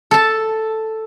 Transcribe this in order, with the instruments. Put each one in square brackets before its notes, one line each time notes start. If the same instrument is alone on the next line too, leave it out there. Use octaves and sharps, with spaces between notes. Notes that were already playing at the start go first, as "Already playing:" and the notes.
[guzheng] A4 A5